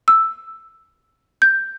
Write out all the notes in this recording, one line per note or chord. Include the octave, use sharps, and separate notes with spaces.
E6
G6